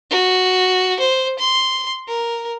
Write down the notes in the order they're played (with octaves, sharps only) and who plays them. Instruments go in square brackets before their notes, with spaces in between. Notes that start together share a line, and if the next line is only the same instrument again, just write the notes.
[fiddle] F#4
C5
C6
A#4